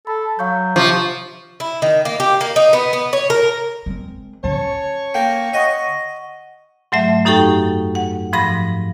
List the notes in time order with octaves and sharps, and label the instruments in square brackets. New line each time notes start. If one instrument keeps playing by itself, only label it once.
[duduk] A4 [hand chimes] B5
[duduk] F#3 [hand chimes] F5 C#6 G6
[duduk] C3 [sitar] F3 [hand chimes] C#6 D6 G6
[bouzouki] E4
D#3
A#3
G4
A#3
D#4
B3
B3
C#5
A#4
[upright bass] G#3 C4
[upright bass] D3 C#4 [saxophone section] C#5 [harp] A5
[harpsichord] A#3 [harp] G5
[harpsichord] D#5 [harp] F#5 C#6 D#6
[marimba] G#2 F#3 A3 E5
F#2 D#4 G4 A4 G5 C#6
F#5
G#2 F3 B5 A#6